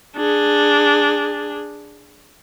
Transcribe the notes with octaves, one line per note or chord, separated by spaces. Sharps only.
D4 G#4